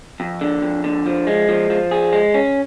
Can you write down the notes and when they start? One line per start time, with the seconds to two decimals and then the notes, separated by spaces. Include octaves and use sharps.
0.20 F2
0.41 D3
0.63 F2
0.84 D3
1.06 F3
1.27 G#3
1.49 F3
1.70 F3
1.91 G#4
2.13 G#3
2.34 C#4